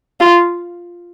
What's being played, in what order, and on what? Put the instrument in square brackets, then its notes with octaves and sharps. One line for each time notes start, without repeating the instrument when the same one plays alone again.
[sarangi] F4